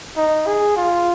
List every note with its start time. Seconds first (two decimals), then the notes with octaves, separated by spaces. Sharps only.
0.16 D#4
0.46 G#4
0.76 F4